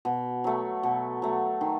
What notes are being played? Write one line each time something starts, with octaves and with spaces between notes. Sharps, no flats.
B2
F#3 A3
B2
F#3 A3
D#3